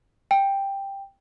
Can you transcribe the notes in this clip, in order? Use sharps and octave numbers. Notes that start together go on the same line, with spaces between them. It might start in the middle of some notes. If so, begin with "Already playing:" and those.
G5